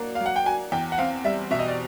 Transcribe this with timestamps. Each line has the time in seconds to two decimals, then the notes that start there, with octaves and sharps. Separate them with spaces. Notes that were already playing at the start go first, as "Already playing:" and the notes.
Already playing: F#3 A#3 D4 F#4
0.15 F5
0.20 F#3
0.26 F#5
0.36 G5
0.46 F#4 G#5
0.72 E2 G5
0.92 F#5
0.98 C4 F5
1.24 G3 E5
1.51 B2 E5
1.59 D#5
1.68 D5